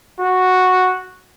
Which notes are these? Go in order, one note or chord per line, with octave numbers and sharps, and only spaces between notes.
F#4